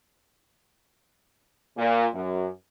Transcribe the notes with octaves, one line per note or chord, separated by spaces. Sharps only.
A#2
F#2